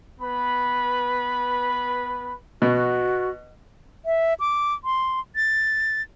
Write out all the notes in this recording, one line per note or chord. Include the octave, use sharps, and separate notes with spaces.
B3 B4 B5
B2 F#4
E5
D6
C6
A6